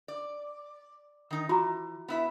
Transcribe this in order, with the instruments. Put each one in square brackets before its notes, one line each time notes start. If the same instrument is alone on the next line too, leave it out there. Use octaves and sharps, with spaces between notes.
[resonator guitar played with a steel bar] D5
D#3 D#4
[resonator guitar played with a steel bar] E3 [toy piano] F4 F#4 A#5
[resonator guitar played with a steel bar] B3 E4 E5